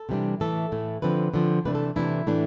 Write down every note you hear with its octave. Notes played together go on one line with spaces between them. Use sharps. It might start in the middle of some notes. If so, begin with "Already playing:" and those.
Already playing: A4
C3 E3 G3 D4
A2 E3 A3 A4
A2 E3 A3
D3 F3 C4 B4
D3 F3 C4
C3 E3 A3 D4 B4
A4
C3 E3 A3 D4 E4
A2 E3 A3 D4